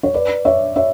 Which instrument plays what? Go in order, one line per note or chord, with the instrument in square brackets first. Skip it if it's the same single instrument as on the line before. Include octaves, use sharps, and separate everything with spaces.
[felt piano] C#5
B4 D5
C#5 E5
C#5 E5